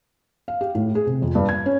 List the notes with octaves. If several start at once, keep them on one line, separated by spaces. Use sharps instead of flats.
F5
G4
A2
G#4
C3
F2
G2
G#6
C#4